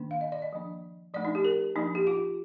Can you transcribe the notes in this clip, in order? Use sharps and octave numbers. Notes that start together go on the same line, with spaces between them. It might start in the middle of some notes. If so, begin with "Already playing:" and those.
Already playing: D#3 A#3 D4
F5
D#5
D5
D#5
F3 A#3 D4
F3 A3 D4 D5
D#4
G4
A#4
F3 A#3 D4 D#4
G4
F4